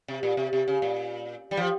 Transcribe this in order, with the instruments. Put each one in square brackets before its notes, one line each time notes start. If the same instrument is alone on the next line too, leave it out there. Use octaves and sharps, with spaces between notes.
[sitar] C3
A#2
C3
C3
C#3
A#2
G3
F3